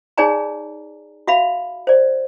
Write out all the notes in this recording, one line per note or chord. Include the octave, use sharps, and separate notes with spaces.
D#4 G#4 C#5 D5 G#5 A#5
F#4 E5 F5 B5
C5 D5